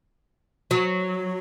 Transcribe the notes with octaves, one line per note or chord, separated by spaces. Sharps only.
F#3